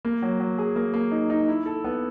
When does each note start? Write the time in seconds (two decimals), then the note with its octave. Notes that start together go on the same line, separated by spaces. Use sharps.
0.05 A#3
0.22 F#3
0.40 F#3
0.58 G#4
0.76 A#3
0.94 A#3
1.12 D#4
1.30 D#4
1.48 E4
1.66 A4
1.84 B3